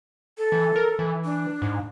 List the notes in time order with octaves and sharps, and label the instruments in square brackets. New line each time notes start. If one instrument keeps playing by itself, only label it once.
[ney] A4
[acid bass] E3
A#4
E3
[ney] D4
[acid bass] G#2